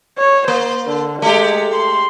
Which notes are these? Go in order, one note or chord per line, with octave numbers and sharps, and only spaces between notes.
C#5
A#3 C5
D3
G#3 A3 G4
C6